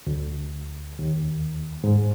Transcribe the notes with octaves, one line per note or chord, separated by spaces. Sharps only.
D2
D#2
G#2